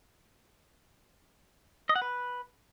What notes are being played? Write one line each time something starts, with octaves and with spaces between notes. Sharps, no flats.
D#5
F#5
B4